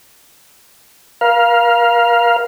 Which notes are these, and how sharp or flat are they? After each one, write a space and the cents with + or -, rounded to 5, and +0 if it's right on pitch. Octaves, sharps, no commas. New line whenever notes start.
A#4 +35 F5 +0